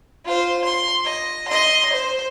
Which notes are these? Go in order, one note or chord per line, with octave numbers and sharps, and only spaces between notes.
F4 C5
C6
D#5
D#5 C6
C5